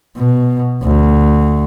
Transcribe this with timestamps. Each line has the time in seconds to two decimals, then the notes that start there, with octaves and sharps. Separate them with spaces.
0.17 B2
0.83 D2